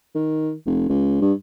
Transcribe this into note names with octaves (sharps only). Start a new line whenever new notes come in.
D#3
F1
C#2
G2